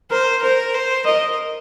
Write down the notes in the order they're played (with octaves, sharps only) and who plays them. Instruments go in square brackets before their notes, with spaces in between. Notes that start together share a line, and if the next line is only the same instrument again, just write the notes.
[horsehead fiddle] A#4 [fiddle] C5
[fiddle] A#4 [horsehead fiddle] C5
[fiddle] C5
[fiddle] A#4 [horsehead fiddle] D#5